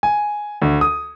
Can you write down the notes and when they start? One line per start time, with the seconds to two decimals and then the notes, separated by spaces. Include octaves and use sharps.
0.03 G#5
0.62 D2
0.81 D#6